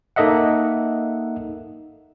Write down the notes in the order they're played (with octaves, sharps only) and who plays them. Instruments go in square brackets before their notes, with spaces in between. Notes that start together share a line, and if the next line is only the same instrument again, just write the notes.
[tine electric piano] A#3 D#4 A4 D#5 E5 F#5